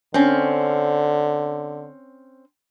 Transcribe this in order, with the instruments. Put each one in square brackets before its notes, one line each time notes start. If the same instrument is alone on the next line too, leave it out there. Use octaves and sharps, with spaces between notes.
[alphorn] D3 [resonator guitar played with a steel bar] C4 C#4